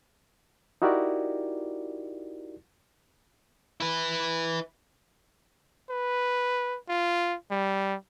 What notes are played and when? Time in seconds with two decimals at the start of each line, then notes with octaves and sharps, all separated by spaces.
0.82 D#4 E4 F#4 G4 A#4 D5
3.80 E4 B4
5.90 B4
6.89 F4
7.51 G3